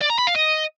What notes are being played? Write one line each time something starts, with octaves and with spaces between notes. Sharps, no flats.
D5
A#5
B5
F5
D#5